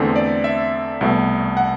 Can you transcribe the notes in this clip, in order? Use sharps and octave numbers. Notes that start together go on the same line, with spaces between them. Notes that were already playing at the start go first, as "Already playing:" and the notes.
Already playing: E2 D3 A3 C4
D5
E5
C2 B2 A3
F#5